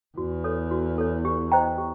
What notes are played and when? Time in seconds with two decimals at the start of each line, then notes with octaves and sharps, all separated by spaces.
0.18 E2 F#4
0.44 A4 C#5
0.71 F#4
0.98 A4 C#5
1.25 G4
1.52 C5 D#5 G5 A#5
1.78 G4